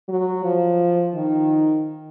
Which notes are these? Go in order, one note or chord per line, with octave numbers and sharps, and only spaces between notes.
F#3
F3
D#3